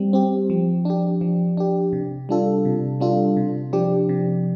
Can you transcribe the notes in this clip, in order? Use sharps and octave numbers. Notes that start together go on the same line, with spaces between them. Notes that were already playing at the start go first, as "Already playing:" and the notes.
Already playing: G3 C4 G4
C4 G4
F3
D4 G4
F3
D4 G4
C3
G3 D4 F4 A4
C3
G3 D4 F4 A4
C3
F3 D4 G4
C3